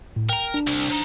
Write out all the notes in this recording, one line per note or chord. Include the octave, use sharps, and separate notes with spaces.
A2
A#4 G5 A#5
D4
C2
F3 D#4